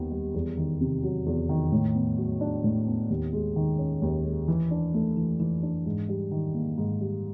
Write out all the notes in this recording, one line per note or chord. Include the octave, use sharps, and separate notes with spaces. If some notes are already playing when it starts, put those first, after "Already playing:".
Already playing: D#2 D#3 B3
G3
E2
D#3
C3
F#3
E2
D#3
A2
B3
F#3
D4
A2
B3
D#2
G#3
D#3
C#4
D#2
G#3
E3
D4
A3
E3
E3
D4
G#2
G3
D#3
A#3
G#2
G3